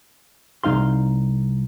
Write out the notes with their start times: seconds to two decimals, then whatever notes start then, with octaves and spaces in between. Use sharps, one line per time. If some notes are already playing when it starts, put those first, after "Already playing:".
0.64 C2 F3 D#4 F5 C6